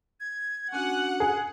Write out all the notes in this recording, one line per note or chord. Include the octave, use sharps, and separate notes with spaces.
G#6
C#4 D4 F#4 F#5 G#5
G#4 F#6